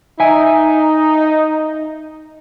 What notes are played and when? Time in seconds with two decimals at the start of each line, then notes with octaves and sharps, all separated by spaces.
0.20 D#4 E5 G#5